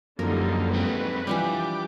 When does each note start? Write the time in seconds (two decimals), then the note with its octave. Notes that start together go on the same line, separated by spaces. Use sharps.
0.19 F#2 D3 F3 G3 A#3 D#4 A#4
0.74 G#3 C4 B4
1.27 E3 F3 G3 D4 G4 D6